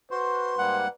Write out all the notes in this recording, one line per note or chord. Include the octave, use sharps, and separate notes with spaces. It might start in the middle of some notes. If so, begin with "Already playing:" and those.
F#4 B4 C5 C6
G#2 G3 A#3 F#5